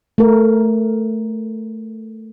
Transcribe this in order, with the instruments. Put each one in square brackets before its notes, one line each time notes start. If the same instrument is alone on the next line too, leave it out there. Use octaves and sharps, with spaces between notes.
[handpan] A3 A#4